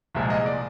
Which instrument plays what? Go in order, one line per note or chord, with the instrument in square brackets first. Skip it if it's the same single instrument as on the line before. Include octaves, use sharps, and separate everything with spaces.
[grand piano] C2 A#2 F3 G#3 E5
D#5
D5